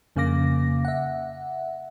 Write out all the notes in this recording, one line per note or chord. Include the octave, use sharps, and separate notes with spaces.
F2 C#3 A#3 F5 D6 A#6
E5 F#5